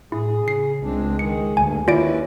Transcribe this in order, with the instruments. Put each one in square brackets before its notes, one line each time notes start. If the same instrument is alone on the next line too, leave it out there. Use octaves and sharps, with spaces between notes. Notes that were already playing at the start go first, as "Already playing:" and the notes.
[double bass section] A2 [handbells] E4 [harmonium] G#4
[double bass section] C#3 [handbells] C7
[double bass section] C#2 G#3 [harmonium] C4 D4
[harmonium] D#3 G#4 [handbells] C#7
[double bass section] D2 [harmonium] G2 [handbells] G#5
[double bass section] D#2 [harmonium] C#4 E4 B4 [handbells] F4 D5 D7